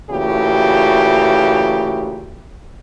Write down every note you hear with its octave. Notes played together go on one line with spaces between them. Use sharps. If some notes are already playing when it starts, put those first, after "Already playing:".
A#2 C#3 E3 A3 F#4 G4